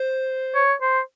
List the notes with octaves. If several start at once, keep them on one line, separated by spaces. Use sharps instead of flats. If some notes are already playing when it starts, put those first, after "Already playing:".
Already playing: C5
C#5
C5